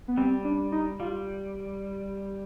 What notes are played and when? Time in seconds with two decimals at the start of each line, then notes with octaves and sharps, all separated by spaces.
0.08 B3
0.17 G3 C4
0.44 D4
0.72 D#4
1.00 G3 F4